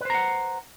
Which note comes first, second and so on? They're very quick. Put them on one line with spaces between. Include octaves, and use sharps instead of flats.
B4 C5 A#5 F#5